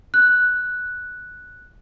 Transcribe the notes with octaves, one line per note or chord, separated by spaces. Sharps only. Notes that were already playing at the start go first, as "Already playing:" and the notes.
F#6